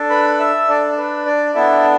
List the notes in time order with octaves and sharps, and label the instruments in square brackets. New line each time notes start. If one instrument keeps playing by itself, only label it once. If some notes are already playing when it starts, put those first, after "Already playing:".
Already playing: [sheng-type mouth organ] D4 A4
B4 B5
E5 E6
D4 A4 D5
A4
B4
D4 D5
B3 D4 E4 A4 E5